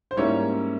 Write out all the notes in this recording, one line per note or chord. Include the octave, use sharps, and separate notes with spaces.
C5
G#2 G3 A#3 C#4 E4 C#5